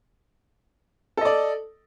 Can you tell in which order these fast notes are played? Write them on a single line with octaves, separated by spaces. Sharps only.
A4 D#5 D5